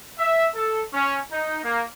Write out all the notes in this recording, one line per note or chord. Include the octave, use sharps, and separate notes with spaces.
E5
A4
C#4
D#4
A#3